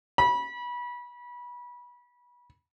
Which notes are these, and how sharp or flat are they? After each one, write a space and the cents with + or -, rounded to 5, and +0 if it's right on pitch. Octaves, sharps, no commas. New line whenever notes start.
B5 -25